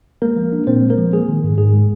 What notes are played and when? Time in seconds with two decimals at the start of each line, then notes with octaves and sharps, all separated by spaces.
0.22 G#3 A#3 A#4
0.36 F3
0.52 D4
0.67 A#2 C4 C5
0.82 G#3
0.90 A#3 A#4
0.98 F3
1.13 G#3 G#4
1.28 D#3
1.44 G#2
1.58 G#2 G#4
1.74 G#3